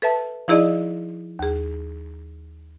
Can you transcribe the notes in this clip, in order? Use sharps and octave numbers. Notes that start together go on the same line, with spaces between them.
A4 B4 E5 A5
F3 D#4 E4 G#4 D5 D#5
D#2 G#4